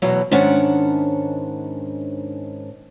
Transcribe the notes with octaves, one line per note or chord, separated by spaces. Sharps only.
E2 B2 F#3
G#2 D#3 C#4 D4 F#5